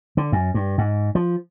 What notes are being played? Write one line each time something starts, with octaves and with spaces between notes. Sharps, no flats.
D3
F#2
G2
G#2
F3